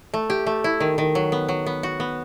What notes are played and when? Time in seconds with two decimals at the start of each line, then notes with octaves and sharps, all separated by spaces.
0.14 A3
0.30 G4
0.47 A3
0.64 E4
0.80 D#3
0.98 D#3
1.15 F#3
1.32 B3
1.48 F#3
1.66 B3
1.83 F#4
2.00 B3